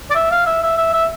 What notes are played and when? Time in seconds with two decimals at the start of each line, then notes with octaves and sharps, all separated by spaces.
0.10 D5
0.15 E5
0.31 F5
0.46 E5
0.63 E5
0.78 E5
0.93 E5